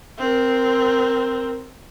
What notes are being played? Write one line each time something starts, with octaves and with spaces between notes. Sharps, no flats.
C4 A#4